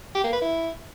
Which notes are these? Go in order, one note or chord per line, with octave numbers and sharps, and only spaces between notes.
G4
A#3
B4
E4